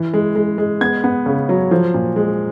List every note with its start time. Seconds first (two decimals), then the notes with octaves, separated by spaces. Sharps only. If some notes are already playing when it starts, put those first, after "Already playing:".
Already playing: E3
0.14 G#3
0.36 G#3
0.58 G#3
0.81 B3 G#6
1.04 B3
1.26 C#3
1.49 F#3
1.71 F3
1.94 A#2
2.16 G#3